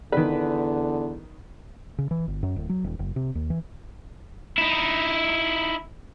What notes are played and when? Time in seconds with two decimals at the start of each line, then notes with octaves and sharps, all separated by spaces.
0.12 E2 D3 D#3 B4
1.98 C#3
2.11 E3
2.28 G1
2.43 F#2
2.56 D1
2.69 F#3
2.84 D#1
2.99 F#1
3.16 C3
3.35 D#2
3.50 E3
4.58 D#4 E4